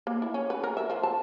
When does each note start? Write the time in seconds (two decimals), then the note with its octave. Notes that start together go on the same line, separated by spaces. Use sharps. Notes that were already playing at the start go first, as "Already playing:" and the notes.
0.07 A#3
0.22 E4
0.34 C#4
0.50 B4
0.64 A#4
0.77 E5
0.90 F3
1.03 A5